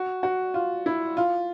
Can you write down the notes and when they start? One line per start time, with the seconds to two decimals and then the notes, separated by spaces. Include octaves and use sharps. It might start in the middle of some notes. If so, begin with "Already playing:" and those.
Already playing: F#4
0.23 F#4
0.54 F4
0.86 E4
1.17 F4